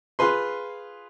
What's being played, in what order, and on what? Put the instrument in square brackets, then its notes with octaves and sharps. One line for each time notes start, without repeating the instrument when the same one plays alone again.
[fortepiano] F4 G#4 B4 C6